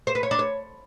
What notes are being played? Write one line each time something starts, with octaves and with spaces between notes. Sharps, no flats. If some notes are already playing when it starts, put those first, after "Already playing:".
C5
B4
C#5
D4
C#5